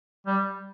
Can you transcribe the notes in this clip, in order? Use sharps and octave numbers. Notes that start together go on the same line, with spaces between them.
G3